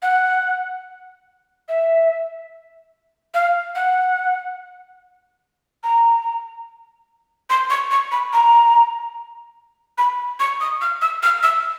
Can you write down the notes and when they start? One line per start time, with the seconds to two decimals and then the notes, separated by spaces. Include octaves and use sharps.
0.02 F#5
1.68 E5
3.34 F5
3.75 F#5
5.83 A#5
7.50 C6
7.70 C#6
7.91 C#6
8.12 B5
8.33 A#5
9.98 B5
10.40 C#6
10.61 D#6
10.81 F6
11.01 E6
11.23 F6
11.43 E6